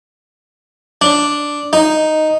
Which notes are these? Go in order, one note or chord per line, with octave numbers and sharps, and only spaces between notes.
D4
D#4